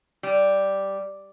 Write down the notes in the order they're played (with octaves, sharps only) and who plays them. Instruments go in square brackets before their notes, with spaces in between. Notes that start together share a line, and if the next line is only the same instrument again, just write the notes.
[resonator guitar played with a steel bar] G3